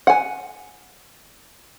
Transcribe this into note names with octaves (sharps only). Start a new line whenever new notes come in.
F#5 G#5